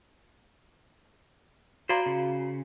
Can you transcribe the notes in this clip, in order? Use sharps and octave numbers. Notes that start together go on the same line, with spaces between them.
F#4 C5 D5 F5 A#5
C#3